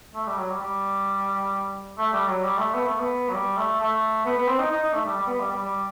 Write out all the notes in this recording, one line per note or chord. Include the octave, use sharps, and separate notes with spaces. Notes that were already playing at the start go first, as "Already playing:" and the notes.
A3
G3
F#3
G3
G3
A3
G3
F#3
G3
A3
B3
A3
B3
F#3
G3
A3
A3
B3
B3
C4
D#4
D#4
D#4
A3
G3
G3
B3
G3
G3
G3